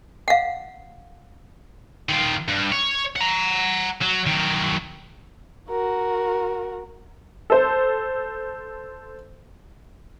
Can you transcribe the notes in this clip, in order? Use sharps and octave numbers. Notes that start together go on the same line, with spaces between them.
F5 F#5
D#3 F4
G2
C#5
F#5 A#5
F#3
D#3 F#3
F#4 A#4
A4 C5